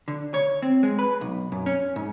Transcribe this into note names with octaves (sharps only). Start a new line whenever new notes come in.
D3
C#5
C4
G#3
B4
B1
F#2
C#4
G#2